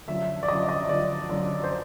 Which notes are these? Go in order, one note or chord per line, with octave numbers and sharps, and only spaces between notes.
F#2 D3 F3 E5
D5
F#2 D3 F3 D#5
D#5
F#2 D3 F3 D5
F#2 D3 F3
C5